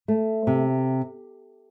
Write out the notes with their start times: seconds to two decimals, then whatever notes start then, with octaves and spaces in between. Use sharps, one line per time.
0.08 A3
0.47 C3